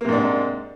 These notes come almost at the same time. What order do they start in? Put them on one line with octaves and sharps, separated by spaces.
A#3 C3 G#2 D4